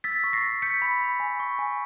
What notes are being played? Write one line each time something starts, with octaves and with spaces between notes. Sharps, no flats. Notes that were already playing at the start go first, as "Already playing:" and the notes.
E6 A6 B6
C#6
A#6 C7
C#6
G6 B6 C#7
B5
B5
G#5
C#6
G#5